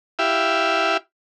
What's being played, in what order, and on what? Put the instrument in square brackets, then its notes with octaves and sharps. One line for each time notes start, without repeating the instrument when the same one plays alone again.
[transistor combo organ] E4 G4 E5 F5